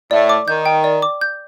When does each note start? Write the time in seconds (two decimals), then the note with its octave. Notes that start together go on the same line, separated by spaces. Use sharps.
0.11 A2 A3 D5
0.29 D6
0.48 D#3 G6
0.66 G5
0.84 D5
1.02 D6
1.21 G6